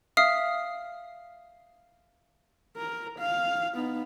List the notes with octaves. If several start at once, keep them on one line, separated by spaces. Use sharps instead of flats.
E5 F5 D#6 F6 C7
A#4
F5
B3 D#4